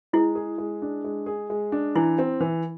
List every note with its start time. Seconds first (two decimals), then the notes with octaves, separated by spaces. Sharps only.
0.13 G#3 E4
0.35 G#4
0.58 G#3
0.82 D4
1.04 G#3
1.26 G#4
1.50 G#3
1.72 D4
1.95 E3 E4
2.19 C4
2.41 E3